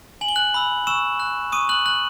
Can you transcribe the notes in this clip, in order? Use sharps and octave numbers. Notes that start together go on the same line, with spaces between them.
G#5 F#7
G7
F#6 F#7
B5 E6
C#6 E6 E7
F#6
C#6 D#6 D#7
F#6 F#7
F#6 F#7